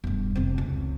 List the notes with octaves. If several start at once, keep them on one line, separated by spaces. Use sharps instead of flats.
E1 G2
F1 C3
C#2